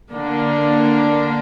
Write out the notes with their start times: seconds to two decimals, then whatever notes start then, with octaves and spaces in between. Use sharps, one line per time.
0.11 D3 A#3 D4